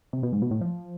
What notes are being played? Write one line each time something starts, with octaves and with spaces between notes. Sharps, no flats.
C3
B2
G#2
B2
A2
F3